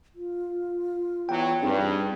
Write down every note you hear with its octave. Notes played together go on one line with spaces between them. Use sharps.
F4
E2 E3 F#3 G5
G2 C4 D#4 G#4